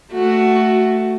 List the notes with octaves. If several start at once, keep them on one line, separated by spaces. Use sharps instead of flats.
A3 F#4